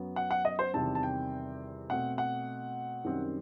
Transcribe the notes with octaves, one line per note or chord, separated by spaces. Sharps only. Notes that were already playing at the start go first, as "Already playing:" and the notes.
Already playing: F#2 F#3 B3
F#5
F#5
D#5
C5
E2 C3 D#3 G3 C4 A5
A5
G5
B2 A3 C4 F#5
F#5
F#2 D#3 G3 C4